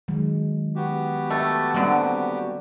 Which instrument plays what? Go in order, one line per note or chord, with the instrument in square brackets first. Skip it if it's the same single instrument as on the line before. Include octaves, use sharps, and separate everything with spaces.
[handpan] D#3 F#3 G#3
[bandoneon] B3 F#4 G4
[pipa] A3 [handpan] A#4
[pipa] D3 F#3 [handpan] G3 A#3 C4